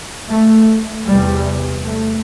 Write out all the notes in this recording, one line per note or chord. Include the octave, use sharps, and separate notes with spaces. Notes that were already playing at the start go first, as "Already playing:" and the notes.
A3
E2 C3 G3
A3